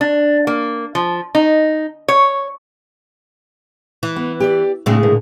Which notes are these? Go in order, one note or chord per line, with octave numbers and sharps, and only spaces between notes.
D4
A#3
F3
D#4
C#5
E3
B3
G4 C#5 D5
A2 C#3 G#3 C4 D4 F#4
A#2 D3